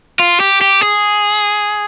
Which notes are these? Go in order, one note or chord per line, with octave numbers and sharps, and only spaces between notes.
F4
G4
G4
G#4